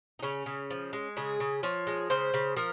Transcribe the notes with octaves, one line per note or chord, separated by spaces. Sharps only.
D#4
C#3 C#4
C#3
F3
G#3
C#3 G#4
C#3
F3 C#5
G#3
C#3 C5
C#3
F3 A#4